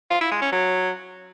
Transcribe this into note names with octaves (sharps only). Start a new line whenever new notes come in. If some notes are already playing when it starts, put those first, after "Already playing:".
F4
E4
G#3
C#4
F#3